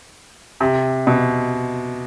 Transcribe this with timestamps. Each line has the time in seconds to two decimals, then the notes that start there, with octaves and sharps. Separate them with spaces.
0.60 C3
1.07 B2